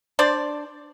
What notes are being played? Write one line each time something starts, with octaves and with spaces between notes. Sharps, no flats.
D4 C5 D5